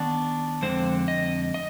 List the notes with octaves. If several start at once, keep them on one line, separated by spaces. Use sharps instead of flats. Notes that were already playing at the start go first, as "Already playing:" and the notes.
Already playing: D#3 B3 D4
F2 D3 G#3 C4 C5
D#5
D#5